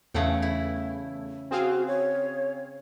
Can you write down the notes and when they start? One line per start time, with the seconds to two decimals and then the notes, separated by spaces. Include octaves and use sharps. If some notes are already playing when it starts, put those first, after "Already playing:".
0.14 E2 C#3 A3 F#5 G5
0.42 E4
1.51 C4 F#4 G#4 F5
1.87 C#5